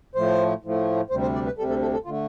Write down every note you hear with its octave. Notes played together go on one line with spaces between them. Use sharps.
A2 F3 A3 C5
A2 F3 A3
D2 C3 G3 C5
C5
D5
B4
D2 C3 G3 A4
A4
A4
A4
D3 A3 F4